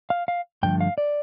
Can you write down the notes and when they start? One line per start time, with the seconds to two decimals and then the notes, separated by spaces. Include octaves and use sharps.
0.10 F5
0.28 F5
0.63 G2 D3 F3 A3 G5
0.81 F5
0.98 D5